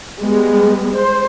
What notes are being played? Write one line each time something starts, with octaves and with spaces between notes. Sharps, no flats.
G3 G#3 B3
C5